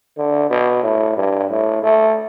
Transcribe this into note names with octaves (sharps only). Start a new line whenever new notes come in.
D3
B2
A2
G2
A2
A3